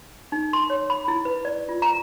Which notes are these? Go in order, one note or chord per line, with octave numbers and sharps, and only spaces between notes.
D#4
C6
C#5
B5
E4
B4
D5
F4
A#5